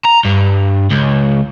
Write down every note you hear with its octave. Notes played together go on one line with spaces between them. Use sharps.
A#5
G2
C#2